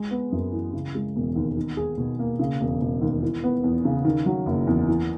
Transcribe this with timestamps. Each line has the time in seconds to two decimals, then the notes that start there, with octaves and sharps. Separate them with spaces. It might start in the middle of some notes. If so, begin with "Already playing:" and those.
Already playing: G#3
0.11 B3
0.32 F#2
0.53 E3
0.73 C#3
0.95 G#3
1.16 E1
1.36 D#2
1.57 D#4
1.77 G#4
1.98 B2
2.19 A#3
2.39 C#3
2.61 E1
2.81 E1
3.01 D#2
3.22 E3
3.44 B3
3.64 E2
3.85 C#3
4.05 D#3
4.26 F#3
4.46 F#1
4.67 E2
4.88 E3